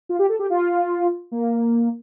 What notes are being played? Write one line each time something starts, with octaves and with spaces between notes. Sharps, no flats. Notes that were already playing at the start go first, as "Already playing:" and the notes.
F4
G4
A4
G4
F4
A#3